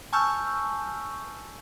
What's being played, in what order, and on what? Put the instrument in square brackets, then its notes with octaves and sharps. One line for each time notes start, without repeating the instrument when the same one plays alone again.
[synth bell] G#5 A5 C#6 E6 F6 G6